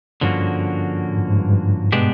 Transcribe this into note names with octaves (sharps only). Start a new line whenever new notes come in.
G2 D3 F3 A#3 C#4 F#4
G#2
G2
G#2
G2
G2
B2 G#3 B3 D4 G4